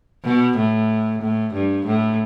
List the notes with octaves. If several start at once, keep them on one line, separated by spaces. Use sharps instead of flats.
B2
A2
A2
G2
A2